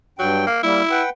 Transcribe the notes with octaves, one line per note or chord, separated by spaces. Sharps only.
G2 F#3 G5
A#3
G3 A#3 E4
B4 F#5 G5